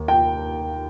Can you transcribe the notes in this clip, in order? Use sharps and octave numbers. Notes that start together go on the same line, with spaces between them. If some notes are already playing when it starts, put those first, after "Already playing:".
Already playing: D#2
G5